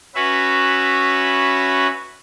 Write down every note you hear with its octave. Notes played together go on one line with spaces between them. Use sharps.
C#4 F#4 B4 E5